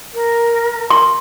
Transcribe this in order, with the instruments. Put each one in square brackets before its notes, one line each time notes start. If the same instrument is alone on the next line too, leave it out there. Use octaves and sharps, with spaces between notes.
[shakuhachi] A#4
[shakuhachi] A#4 [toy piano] C6